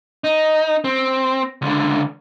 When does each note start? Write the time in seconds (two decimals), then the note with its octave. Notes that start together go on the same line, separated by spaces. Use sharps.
0.24 D#4
0.84 C4
1.62 C#2 D3